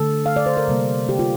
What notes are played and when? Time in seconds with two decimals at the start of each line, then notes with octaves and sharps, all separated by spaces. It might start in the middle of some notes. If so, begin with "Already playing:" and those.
Already playing: D3 A3 A4
0.26 F5
0.36 D5
0.46 C5
0.57 A#4
0.68 C3 G3 A#3
1.09 G4
1.19 F4